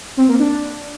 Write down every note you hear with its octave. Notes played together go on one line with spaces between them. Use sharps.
C4
A#3
D4